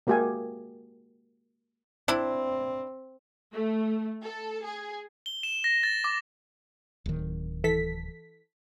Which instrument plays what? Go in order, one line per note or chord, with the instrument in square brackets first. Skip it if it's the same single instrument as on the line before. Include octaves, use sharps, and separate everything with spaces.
[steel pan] G#3 A#3 F#4 G4 E5 G#5
[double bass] C4 [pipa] D4 E4
[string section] A3
A4
G#4
[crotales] G7
E7
A#6
A6
D6
[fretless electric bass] D1 D#3
[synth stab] E3 A4 B6